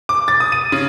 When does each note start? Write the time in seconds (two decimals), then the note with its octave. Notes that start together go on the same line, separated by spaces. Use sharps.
0.09 D6
0.28 A6
0.40 D#6
0.52 D#7
0.72 C#3